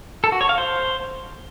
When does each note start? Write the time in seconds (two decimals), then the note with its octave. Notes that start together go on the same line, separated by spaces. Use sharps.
0.24 A4
0.32 F#4
0.41 C#5
0.49 F5
0.58 C5